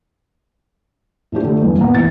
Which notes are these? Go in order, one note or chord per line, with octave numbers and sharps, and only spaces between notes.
A2 F3 D4 G4
D3 A3
E2 G2
D#1 A#3 B3 A#5
A1 A6